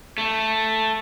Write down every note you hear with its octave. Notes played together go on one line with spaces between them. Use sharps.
A3